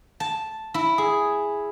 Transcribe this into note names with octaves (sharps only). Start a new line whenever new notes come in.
A5
E4
G#4